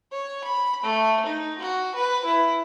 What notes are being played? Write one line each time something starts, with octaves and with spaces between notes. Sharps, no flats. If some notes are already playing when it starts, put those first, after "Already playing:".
C#5
B5
A3
D#4
F#4
B4
E4